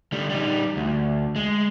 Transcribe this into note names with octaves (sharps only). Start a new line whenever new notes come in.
D3 G3
G3 D#4
D2
G#3